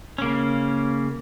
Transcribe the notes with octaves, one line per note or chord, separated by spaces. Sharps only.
C#3 A#3 C#4